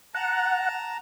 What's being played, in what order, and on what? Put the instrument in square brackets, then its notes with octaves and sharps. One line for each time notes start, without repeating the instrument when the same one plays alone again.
[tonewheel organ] F#5 [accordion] A5 A#5